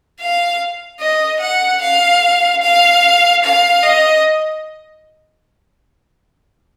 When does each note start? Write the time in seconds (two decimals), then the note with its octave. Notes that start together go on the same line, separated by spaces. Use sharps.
0.20 F5
1.00 D#5
1.41 F#5
1.82 F5
2.62 F5
3.44 F5
3.83 D#5